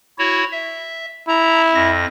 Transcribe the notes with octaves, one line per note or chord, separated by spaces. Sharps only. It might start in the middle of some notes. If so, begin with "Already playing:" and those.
E4 F#4 C#5
E5
E4 A#5
F2 A#6